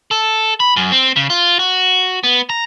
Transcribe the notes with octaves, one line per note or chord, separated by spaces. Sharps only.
A4
B5
F#2
C4
C#3
F4
F#4
B3
A#5